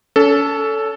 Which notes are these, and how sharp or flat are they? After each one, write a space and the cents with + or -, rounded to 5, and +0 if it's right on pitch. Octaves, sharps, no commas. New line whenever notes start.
C#4 +35 A4 +0